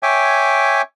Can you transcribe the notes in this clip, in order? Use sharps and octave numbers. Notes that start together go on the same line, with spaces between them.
C#5 E5 G5 G#5 D6